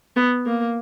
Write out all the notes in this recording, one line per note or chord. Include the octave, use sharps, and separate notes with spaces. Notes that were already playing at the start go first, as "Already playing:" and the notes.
B3
A#3